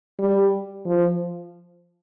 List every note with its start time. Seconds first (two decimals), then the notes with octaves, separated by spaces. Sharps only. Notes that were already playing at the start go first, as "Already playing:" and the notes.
0.19 G3
0.86 F3